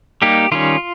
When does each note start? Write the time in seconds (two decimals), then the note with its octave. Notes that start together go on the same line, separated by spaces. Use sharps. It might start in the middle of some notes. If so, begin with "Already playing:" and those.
0.22 G3 A#3 D#4 G4
0.52 D#3 G3 C#4 F4